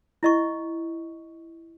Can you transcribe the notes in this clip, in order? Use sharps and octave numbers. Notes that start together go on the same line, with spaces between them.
E4 D#5 C#6